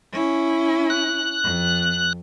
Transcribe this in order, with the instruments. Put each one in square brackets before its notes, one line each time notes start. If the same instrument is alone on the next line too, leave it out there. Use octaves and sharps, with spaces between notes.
[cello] C#4 E4
[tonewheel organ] F#6
[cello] F2